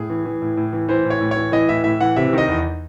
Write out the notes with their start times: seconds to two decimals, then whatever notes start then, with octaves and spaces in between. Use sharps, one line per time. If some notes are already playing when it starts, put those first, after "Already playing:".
Already playing: A2 G#4
0.10 E3
0.26 E3
0.42 A2
0.57 A2
0.73 E3
0.89 E3 C5
1.05 A2
1.10 C#5
1.21 A2
1.31 E3 C#5
1.52 E3 D#5
1.69 A2 E5
1.84 A2 E5
2.01 E3 F#5
2.16 C3 E5
2.33 D#3 D#5
2.48 E2